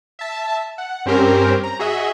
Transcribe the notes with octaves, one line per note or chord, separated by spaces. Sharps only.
E5 A5
F#5
G2 C4 C#4 G4 A#4 C5
A#5
F#4 G#4 D#5 E5